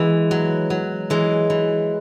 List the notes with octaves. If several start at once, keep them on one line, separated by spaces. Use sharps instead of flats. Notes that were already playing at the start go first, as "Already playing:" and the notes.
Already playing: E3 G#3 B3
F#3
F#3
E3 G#3
E3